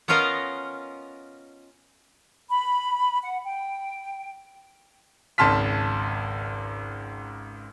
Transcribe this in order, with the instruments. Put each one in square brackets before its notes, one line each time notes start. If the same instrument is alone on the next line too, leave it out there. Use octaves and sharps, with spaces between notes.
[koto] B3 C#4 F4 A#4 D#5 F5
[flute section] B5
F#5
G5
[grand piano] G#1 C#2 A5 C6 F6 B6